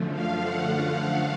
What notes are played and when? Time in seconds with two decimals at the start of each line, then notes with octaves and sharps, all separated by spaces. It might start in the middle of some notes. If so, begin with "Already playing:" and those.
Already playing: F#2 D3 F3 A3
0.12 F5
0.42 F#5